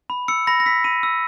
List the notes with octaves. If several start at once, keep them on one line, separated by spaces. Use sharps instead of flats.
B5
E6 C#7
B5 A#6
A#6
E6 B6
B5 D#7
E6